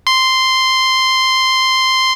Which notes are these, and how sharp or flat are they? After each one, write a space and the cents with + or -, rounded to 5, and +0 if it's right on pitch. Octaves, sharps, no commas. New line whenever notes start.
C6 -5